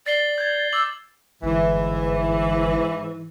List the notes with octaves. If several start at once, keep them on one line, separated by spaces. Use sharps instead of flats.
D5 A6 C7 G7
G6 G#6
D6 E6 F#7
G1 G#2 E3